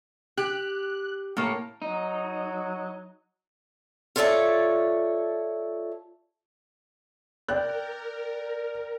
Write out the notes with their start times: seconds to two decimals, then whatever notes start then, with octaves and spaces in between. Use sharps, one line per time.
0.37 G4 F#6
1.37 A2 A#3 C#5
1.82 F#3 D#4
4.16 F4 A4 C#5 D5 E5 A5
7.48 A#4 D5 G5 F#6